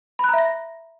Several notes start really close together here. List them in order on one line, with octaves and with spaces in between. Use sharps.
B5 F#6 A#5 E5 A#6